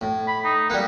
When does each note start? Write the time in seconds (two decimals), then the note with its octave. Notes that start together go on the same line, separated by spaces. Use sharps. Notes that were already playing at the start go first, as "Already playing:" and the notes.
0.01 A2
0.28 B5
0.44 D#4
0.70 G3 A#3 F#5